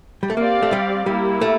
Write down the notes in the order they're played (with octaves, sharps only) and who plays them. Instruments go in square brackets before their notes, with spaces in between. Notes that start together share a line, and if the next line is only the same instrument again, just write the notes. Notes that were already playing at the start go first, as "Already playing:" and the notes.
[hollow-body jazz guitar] G3
A3
[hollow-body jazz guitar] A#3 [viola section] C4 G4 D5 F5
[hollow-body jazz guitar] A3
G3
[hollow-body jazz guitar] G3 [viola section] A#3 E4 G4
[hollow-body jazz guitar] A3